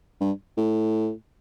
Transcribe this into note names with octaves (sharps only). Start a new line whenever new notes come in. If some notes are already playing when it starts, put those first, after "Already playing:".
G2
A2